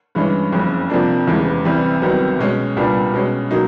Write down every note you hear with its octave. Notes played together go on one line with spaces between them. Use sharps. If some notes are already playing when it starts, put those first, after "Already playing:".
G2 E3 G#3 C#4
F#1 F2 C#3
F2 C3 F3 A#3 D4
F1 E2 C#3 E3 G#3
C2 C3 E3 G3
C2 C3 D#3 F#3 B3
B2 G#3 C#4
C2 A#2 G3 B3 D4
B2 G#3 C#4
B2 F#3 A#3 D#4